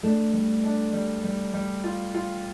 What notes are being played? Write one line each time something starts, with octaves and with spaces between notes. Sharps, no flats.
A3 D4
G3
D4
G3
G3
G3
F4
F4